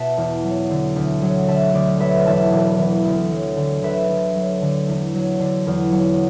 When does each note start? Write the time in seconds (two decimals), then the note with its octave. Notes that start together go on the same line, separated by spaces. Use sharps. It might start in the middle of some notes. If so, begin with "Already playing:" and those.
Already playing: B2 E5 A5
0.17 E2
0.44 F#3
0.70 D3
0.96 D2
1.22 F#3
1.48 D3 E5 A5
1.74 D2 D5
2.00 F#3 B4 E5
2.27 E2 E5 A5
2.52 E1
2.79 E3
3.05 D2
3.31 F#3
3.57 D3
3.83 D3 B4 E5
4.10 D2
4.36 F#3
4.62 D3
4.88 E2
5.14 F#3
5.40 D3
5.67 E2
5.92 F#3